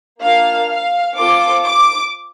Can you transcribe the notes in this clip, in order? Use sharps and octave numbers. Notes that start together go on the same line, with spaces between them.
A#3 D4 F4 F5
F5
C4 F4 A4 D6
D6